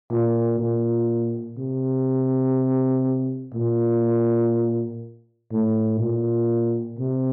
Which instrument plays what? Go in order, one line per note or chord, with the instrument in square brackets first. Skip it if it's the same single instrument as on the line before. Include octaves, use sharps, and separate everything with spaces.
[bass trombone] A#2
A#2
C3
A#2
A2
A#2
C3